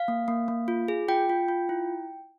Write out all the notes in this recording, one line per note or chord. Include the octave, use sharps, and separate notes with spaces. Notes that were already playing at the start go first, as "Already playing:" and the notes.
Already playing: F5
A#3
A#3
A#3
F4
G#4
F4 G5
F4
F4
E4